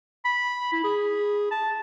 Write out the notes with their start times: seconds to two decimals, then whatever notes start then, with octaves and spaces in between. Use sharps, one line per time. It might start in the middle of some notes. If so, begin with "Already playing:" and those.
0.25 B5
0.73 E4
0.84 G#4
1.51 A5